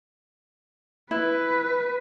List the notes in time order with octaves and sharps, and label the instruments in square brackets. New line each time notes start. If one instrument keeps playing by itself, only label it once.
[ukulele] E4 [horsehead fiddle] B4